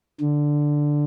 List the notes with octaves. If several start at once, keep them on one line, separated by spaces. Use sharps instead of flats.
D3